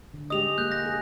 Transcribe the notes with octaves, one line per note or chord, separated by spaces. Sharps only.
D3
G#3 G4 D#5 D#6 F7
G#3 A#3 F#6 G6
A#6
G#4